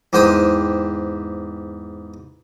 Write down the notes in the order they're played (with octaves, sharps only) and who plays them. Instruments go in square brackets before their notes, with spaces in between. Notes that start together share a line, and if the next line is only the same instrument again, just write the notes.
[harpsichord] E2 G#2 G4 C5 G5 D#6